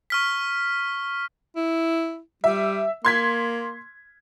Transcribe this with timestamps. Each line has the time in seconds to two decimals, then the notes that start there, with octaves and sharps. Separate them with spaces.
0.10 C#6 F6 B6
1.56 E4
2.44 G3 E5
3.05 A#3 C6 G#6 B6